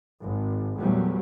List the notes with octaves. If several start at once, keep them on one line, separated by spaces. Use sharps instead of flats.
G#1
E2 A#2 F#3 G3 A3